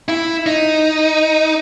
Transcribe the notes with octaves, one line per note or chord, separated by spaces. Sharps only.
E4
D#4